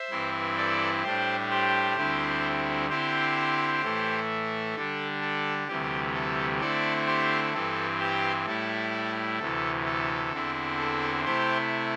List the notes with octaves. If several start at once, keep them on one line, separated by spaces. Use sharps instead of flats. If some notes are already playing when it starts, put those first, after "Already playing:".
Already playing: C5 E5
G2 E3 C4 E4
A4 D5
A2 G3 D4 G4 C5
G4 C5
D2 D3 G3 C4 E4
D3 C4 E4 G4 C5
A2 E3 A3 E4
D3 G3 D4 A4
A4
D2 C3 E3 G3 G4
A4
D3 A3 C4 E4 A4 D5
G4 C5
G2 E3 C4 A4
G4 C5
A2 G3 E4 A4
D2 C3 E3 A4
A4
E2 D3 C4 E4
A4
C3 A3 E4 G4 C5